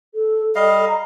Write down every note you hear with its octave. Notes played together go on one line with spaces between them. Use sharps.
A4
G3 A4 D#5 F5
A#5